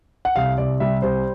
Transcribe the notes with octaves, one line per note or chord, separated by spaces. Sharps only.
F#5
C2 F5
C2 D5
G3 E5
C2 C5